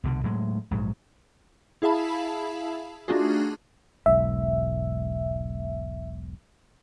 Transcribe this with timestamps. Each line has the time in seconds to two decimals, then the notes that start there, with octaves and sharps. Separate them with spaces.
0.04 C2 B2 D3
0.24 A2 F#3 G#3
0.71 A#1 G#2 F#3
1.82 E4 G#4 E5 F5 A5 B5
3.08 A3 D4 D#4 F4 F#4 G#4
4.06 E1 B1 G#2 E5